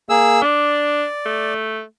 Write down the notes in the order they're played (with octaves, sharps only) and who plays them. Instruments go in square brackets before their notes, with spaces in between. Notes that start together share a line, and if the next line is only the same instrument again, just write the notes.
[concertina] A#3 G#4 E6
[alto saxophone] D4 [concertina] D5
[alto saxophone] A3